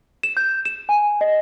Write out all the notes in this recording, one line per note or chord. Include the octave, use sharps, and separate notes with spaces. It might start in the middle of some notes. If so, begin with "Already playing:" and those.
E7
G6
E7
G#5
D#5